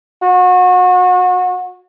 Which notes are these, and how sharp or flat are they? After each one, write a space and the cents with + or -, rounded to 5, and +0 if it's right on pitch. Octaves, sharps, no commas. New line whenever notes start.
F#4 -30